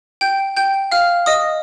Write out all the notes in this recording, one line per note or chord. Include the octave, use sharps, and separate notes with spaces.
G5 G6
G5 G6
F5 F6
D#5 D#6